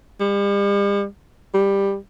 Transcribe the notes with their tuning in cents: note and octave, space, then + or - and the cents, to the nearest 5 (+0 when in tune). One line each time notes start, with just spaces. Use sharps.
G3 +45
G3 +10